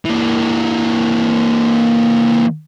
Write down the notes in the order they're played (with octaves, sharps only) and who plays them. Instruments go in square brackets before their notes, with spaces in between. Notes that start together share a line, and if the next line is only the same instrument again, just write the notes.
[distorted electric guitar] E3 A#3